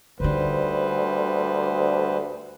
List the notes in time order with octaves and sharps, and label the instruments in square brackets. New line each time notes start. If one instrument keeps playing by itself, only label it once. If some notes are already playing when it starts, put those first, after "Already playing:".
[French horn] D2 [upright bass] D3 D#4 [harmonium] G3 B4 C5